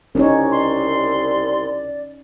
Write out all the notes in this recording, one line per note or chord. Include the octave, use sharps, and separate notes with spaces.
C2 C#4 D#4 C#5
D5 C6